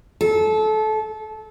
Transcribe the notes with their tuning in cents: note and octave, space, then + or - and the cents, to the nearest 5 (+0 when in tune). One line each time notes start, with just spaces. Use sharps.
A4 -25